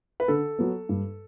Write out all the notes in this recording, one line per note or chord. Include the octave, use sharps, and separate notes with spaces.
B4
D3 A4
F#3 B3
G2